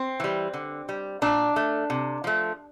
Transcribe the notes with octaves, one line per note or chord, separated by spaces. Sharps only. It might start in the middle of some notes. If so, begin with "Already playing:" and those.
Already playing: C4
E3 G3
D3
G3
A#2 D4
A3
C3
F3 A3